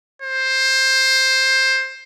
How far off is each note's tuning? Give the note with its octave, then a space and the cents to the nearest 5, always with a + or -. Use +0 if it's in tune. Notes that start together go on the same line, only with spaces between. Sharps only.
C5 +15